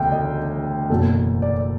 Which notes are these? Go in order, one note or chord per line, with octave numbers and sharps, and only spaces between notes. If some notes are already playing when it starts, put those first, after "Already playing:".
Already playing: E1 D2 C#3 G5
D#5
F#1 E2 B2 F#3 A4
D5